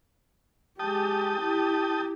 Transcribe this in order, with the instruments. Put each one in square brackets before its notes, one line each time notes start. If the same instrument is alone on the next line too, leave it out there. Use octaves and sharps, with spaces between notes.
[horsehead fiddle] G#3 G4 [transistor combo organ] G5 A5 D#6
[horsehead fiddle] E4 G4